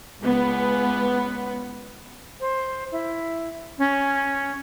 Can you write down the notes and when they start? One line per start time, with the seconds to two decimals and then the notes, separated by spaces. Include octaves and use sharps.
0.20 C#2 B3
2.40 C5
2.92 E4
3.78 C#4